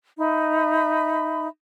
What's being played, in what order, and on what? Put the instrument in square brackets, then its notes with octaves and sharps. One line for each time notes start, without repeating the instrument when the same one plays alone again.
[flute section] D#4 E5 B5